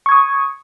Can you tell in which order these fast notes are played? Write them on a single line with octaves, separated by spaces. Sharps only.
C#6 G#6 D#6